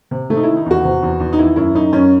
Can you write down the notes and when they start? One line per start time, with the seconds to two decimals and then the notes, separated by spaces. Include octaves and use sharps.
0.11 C3
0.30 C3 A3
0.37 D#4
0.43 D#3 E4
0.57 D#4
0.66 E2 F#4
0.84 C3
1.03 E2
1.20 E2
1.33 D#4
1.39 D#3 E4
1.56 F#2 E4
1.75 F#2 D#4
1.93 F#2 C#4